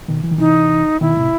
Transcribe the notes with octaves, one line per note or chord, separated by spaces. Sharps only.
B2 D#3
E3
D#3
C3 E3 D#4
B2 D#3 E4
A2 C3